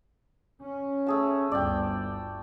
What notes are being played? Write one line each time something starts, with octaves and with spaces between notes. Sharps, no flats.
C#4
A3 G#4 A5
G1 D2 D5 G5